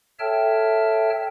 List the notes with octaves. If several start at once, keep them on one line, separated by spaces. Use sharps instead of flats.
A4 C#5 E5 G5 A5 F6